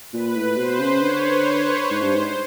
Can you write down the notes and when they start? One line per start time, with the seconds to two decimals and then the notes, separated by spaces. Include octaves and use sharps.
0.13 A#2 B4
0.36 A2
0.57 B2 C5
0.80 C#3
1.01 D3 C#5
1.90 G#2 C5
2.02 G2
2.14 G#2